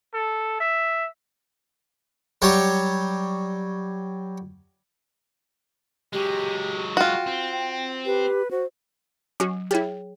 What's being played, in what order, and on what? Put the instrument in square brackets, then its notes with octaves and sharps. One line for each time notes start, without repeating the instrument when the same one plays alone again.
[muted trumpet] A4
E5
[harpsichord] F#3 G3 G4 C#5
[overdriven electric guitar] F#3 G#3 [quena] G4
[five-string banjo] F4 F#4 [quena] G5
[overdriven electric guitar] C4
[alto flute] G4 [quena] B4
[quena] F#4 [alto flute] C5
[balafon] F#3 [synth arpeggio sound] C#4 F#4
[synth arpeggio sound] E4 G4 [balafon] G#4 C#5 G5